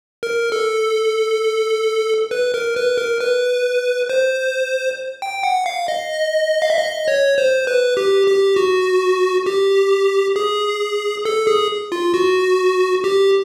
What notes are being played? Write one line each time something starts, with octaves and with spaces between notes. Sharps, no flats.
A#4
A4
B4
A#4
B4
A#4
B4
C5
G5
F#5
F5
D#5
F5
E5
D#5
C#5
C5
B4
G4
G4
F#4
G4
G#4
A4
G#4
F4
F#4
G4